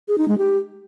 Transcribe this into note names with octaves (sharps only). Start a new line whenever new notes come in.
G#4
D#4
G#3
G4